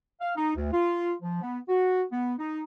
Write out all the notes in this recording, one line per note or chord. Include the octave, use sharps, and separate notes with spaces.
F5
D#4
D2
F4
F3
B3
F#4
B3
D#4